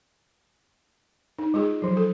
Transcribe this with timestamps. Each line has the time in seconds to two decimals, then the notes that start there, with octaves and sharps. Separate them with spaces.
1.38 D#4
1.54 G#3 F4 G#4
1.82 F3 F#3
1.97 A4